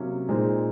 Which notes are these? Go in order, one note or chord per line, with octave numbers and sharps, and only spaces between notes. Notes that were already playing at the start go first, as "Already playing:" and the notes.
Already playing: C3 F#3 A#3 C#4
A#2 G#3 C4 D#4